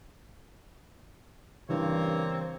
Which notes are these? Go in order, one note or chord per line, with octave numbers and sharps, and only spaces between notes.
G2 C#3 E3 A#3 C4 C#5